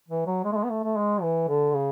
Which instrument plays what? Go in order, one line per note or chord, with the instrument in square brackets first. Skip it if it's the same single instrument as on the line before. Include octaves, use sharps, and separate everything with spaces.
[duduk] E3
F#3
G#3
A3
G#3
B3
A3
A3
G#3
E3
D3
C#3